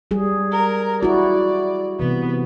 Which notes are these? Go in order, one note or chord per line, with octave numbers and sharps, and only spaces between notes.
G3 G#4
A#4
E4 F#4 D5
C3 E3 B3